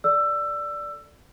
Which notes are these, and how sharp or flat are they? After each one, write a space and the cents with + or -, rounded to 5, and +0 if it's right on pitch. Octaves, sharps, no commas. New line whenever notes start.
A4 +0 D5 +0 E6 +20